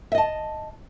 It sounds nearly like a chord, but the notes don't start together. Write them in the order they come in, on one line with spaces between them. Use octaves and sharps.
E5 D#5 A5